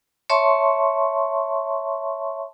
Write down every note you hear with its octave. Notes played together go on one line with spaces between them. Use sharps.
C#5 E5 A5 C6 C#6